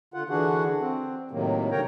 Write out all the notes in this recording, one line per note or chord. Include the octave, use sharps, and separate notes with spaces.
D3 F4 F#5
D3 E3 D4 F#4 G#4 F#5
C4
A2 C3 D#3 F#3 A#3
G#2 D3 A#4 C#5 G5 A#5